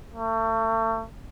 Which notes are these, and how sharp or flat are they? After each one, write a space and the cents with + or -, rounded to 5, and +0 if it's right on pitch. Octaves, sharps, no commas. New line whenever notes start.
A3 +35